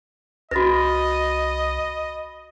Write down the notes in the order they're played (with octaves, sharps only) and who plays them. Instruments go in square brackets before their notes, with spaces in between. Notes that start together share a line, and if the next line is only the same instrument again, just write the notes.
[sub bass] C2 [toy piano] F#4 B4 [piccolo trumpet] D#5 [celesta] B5 A6 A#6